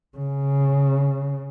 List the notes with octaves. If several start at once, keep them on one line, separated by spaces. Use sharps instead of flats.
C#3